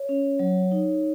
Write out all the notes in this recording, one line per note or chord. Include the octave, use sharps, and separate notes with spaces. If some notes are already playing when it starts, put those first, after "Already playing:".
Already playing: C#5
C#4
F#3
D#4